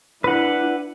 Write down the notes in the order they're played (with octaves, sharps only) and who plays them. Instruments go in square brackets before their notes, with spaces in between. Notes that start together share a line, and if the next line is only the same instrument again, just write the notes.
[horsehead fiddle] D4 E4 [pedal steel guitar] B4 F#5